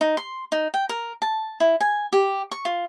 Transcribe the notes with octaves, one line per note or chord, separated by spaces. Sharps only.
D#4
C6
D#4
G5
A#4
A5
E4
G#5
G4
C#6
F4